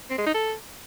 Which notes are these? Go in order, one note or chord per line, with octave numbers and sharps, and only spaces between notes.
C4
G#3
D#4
A4